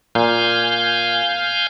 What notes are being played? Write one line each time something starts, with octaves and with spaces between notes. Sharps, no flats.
A#2 F5 G#5 G6